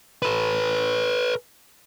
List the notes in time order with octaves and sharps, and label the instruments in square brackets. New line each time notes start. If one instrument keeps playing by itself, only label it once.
[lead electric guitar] A4 B4